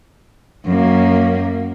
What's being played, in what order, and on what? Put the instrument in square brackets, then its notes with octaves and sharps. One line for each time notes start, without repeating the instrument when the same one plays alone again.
[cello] F#2 A#3